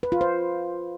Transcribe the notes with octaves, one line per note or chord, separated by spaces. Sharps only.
B4
F4
C5